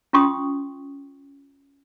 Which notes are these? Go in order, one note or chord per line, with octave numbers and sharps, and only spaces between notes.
C#4 F4 G5 C6 C#6 D#6